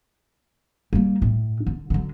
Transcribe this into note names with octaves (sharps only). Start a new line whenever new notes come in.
G3 A#3
A2
D3
D3 F#3